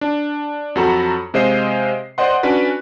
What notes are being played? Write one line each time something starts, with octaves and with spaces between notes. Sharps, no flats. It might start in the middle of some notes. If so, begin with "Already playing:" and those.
D4
F2 F#3 F#4 A4 A#5 B5
C3 G#3 C5 D#5 F5 C7
C5 D5 D#5 F#5 C6
C#4 D4 F#4 B4 D5